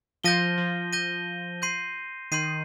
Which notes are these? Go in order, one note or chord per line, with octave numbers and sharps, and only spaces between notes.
F3 G6 A#6 D#7 G7
F3
G6 A#6 D#7 G7
C6 G6 C7 D#7
D#3 C6 G6 C7 D#7